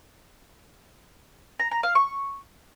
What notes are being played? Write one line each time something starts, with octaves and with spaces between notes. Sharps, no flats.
A#5
A#5
F5
C#6